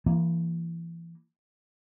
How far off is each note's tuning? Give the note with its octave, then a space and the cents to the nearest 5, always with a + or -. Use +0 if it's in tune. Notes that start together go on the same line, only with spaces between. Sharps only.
E3 +30 A#3 +0